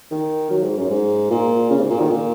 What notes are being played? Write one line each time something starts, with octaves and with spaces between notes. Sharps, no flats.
D#3
F#3
G#2
F#2
G#2
A#2
C#3
G#2
A#2
D#3
A#2